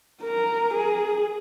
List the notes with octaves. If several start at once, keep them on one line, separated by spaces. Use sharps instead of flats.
A#4
G#4